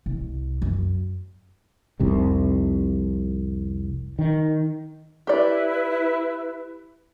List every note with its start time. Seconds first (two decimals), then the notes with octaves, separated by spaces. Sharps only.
0.06 C2
0.62 F#2
2.00 F1 C2 F2 C3
4.19 D#3
5.27 E4 G4 B4 D5